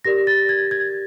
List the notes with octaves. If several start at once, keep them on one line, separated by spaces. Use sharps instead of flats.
G4 A#4 D5 A#6
A6
G#6
G#6